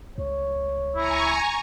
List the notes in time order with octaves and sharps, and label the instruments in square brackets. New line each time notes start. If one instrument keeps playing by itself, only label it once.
[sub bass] C#2 [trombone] C#5
[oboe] E4 [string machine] G#5 A#5 C#6